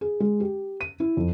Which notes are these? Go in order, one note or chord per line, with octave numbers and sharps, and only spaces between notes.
G#4
G#3
G4
D#7
E4
F2